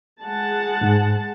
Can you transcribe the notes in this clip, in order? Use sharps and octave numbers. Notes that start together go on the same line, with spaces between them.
G#3 F#5 A5
G#2